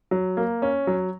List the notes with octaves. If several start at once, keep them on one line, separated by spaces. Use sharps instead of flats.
F#3
A#3
C#4
F#3